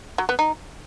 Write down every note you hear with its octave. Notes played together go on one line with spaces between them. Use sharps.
F#3
B3
D#4